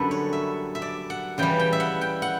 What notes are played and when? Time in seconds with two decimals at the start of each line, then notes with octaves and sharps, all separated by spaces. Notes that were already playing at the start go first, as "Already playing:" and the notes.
Already playing: F#2 D3 G3 B3 D4 A4 B4
0.11 C#5
0.33 E5
0.75 E5
0.82 D5
1.10 F#5
1.38 C#3 E3 G3 G5
1.59 G5
1.73 E5
1.80 F#5
2.01 G5
2.22 F#5